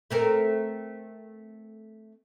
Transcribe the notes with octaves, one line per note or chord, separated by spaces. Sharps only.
A3 C4 A#4